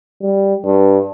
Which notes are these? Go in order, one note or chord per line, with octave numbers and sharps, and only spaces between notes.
G3
G2